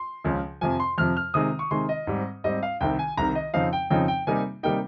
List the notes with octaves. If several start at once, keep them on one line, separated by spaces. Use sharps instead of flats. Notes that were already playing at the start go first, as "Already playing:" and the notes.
Already playing: C6
C#2 C#3 F3
F2 C3 F3 G#5
C6
F2 C3 F3 F6
F6
C3 D#3 G#3 D#6
C#6
C3 D#3 G#3 C6
D#5
G#2 G3 C4
G#2 G3 C4 D#5
F5
C2 C3 D#3 G5
G#5
C2 C3 D#3 A#5
D#5
F2 C#3 F3 C4 D#4 F5
G5
F2 C#3 F3 C4 D#4 G5
G5
C3 G3 A#3 D#4 G#5
C3 G3 A#3 D#4 G5